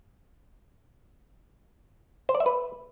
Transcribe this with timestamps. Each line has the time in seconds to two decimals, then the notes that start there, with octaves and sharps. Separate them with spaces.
2.29 C5
2.35 D5
2.40 E5
2.46 B4